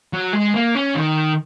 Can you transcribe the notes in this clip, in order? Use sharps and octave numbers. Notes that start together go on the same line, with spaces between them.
F#3
G#3
A#3
C#4
D#3